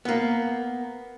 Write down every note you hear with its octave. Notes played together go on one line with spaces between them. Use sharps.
A#3 B3